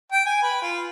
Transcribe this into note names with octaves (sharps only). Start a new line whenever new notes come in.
G5
G#5
B4
F4